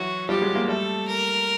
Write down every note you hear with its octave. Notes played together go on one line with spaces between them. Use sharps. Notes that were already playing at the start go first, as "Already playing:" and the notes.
Already playing: E3 F#3 F#4
F3 G3 G4
F#3 G#3
G#3 A#3
G3 A3 A4
A#4